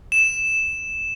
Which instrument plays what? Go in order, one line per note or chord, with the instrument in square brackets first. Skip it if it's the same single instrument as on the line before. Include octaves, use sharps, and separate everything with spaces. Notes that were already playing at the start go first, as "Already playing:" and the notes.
[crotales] E7